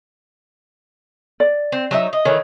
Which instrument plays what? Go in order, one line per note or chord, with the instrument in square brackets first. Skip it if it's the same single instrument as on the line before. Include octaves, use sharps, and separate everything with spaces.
[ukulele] D5
[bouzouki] C4
F#3 D#4 E5
D#5
[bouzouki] D#3 E3 A3 [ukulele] C#5